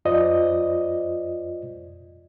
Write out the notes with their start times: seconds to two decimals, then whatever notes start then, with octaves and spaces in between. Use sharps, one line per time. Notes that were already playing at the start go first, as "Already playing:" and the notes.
0.05 F2 F4 C5 D5 D#5